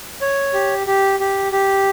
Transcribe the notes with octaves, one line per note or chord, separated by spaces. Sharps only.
C#5
G4
G4
G4
G4